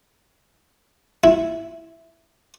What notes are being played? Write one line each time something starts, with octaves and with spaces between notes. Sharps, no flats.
E4